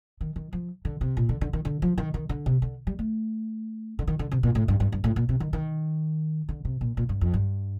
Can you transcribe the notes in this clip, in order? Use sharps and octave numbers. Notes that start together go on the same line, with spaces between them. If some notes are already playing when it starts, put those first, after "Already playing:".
D#3
D#3
F3
D3
C3
A#2
D3
D3
D#3
D3
F3
D#3
D#3
D3
C3
D3
G3
A3
D3
D#3
D3
C3
A#2
A2
G2
G2
G2
A2
A#2
C3
D#3
D#3
D3
C3
A#2
A#2
G2
F2
G2